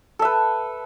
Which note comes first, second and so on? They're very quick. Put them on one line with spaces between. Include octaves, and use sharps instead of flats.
A4 E5 B4